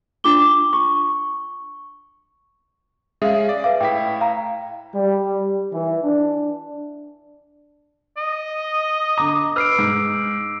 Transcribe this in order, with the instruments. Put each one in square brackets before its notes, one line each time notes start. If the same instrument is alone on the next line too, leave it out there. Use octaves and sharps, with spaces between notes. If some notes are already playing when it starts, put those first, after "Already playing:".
[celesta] D4 F4 D6 G7
C#6
[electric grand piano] G#3 C#4 G#4 [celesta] E5 F5
[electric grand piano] D5
[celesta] B4 E5 F5 [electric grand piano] D6
[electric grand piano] A2 E4 B6 [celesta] G5
[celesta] F5 A#5
[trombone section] G3
E3
D4
[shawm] D#5
[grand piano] D3 A#5 [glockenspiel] D6
[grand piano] B4 F6 [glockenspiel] E6 C7 D7
[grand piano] G#2